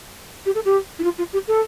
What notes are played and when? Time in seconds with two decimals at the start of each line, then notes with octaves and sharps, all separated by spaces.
0.46 G4
0.55 A4
0.65 G4
0.99 E4
1.04 F4
1.18 F4
1.33 G4
1.48 A4